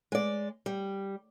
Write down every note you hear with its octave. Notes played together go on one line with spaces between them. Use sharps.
G#3 D5
G3